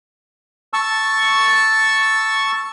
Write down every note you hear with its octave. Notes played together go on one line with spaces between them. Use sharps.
A5 C#6 E6